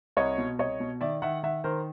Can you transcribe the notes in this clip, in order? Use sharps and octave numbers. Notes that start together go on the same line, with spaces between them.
C2 C#5 D#5
B2
C2 C#5 D#5
B2
D#3 D5 E5
D#3 E5 F#5
D#3 E5 F#5
D#3 A#4 C5